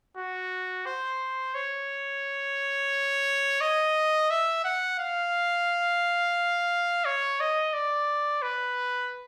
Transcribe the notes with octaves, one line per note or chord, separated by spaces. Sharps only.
F#4
C5
C#5
D#5
E5
F#5
F5
C#5
D#5
D5
B4